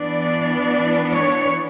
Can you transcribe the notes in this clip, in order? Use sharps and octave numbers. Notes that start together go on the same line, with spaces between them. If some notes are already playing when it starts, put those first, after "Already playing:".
Already playing: E3 B3 D4 D5
C#5